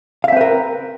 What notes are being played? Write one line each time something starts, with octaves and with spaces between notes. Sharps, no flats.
C4 A#4 B4 E5 F5